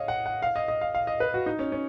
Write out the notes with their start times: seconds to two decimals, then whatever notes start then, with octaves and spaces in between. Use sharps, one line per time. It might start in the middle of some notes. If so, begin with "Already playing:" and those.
Already playing: C#5 D#5 F5
0.08 F#5
0.26 F#5
0.42 F5
0.56 D#5
0.68 D#5
0.81 F5
0.95 F5
1.07 D#5
1.20 B4
1.34 F#4
1.46 D#4
1.59 C#4
1.72 C#4